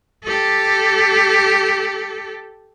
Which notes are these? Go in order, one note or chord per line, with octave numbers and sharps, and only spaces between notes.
G4 A4